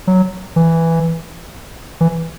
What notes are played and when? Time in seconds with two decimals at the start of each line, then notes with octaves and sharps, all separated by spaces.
0.07 F#3
0.56 E3
2.01 E3